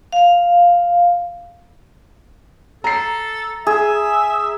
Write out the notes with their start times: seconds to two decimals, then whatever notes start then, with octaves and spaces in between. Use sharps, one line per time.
0.12 F5
2.84 A4 A#5 C7
3.67 G#4 E5